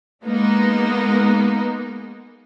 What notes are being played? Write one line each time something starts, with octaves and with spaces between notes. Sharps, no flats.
G#3 A#3 B3 D#4